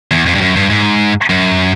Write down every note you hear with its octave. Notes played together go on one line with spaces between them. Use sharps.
E2
F2
G2
F#2
G2
G#2
F#2